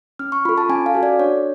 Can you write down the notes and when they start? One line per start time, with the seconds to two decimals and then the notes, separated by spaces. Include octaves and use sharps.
0.19 C#4 F6
0.32 C#6
0.45 F4 A4 B5
0.58 A5
0.69 C#4 G#5
0.86 F5
0.95 F#4 A4
1.03 D5
1.19 D4 C#5